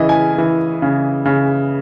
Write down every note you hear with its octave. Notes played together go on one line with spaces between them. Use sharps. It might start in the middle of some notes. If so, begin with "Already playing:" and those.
Already playing: C#3 E3 D#5
G#5
E3
C#3
C#3